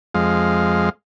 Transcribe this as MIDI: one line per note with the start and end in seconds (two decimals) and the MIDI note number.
0.15 0.90 41
0.15 0.90 56
0.15 0.90 77